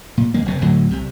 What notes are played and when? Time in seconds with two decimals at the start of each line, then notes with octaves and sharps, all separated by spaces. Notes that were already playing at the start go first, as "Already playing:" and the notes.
0.17 A#2
0.34 D#2 G#3 A#3
0.46 F1 C3
0.61 D2 A2 D3 F#3
0.90 C2 C3